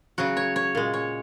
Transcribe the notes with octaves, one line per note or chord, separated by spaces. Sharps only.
C#3 F#3 F#4
C#5
C#5
A#2 G#3
C#5